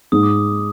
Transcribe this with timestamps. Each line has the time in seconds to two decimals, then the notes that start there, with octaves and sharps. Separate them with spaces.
0.12 G#2 D#6
0.23 D6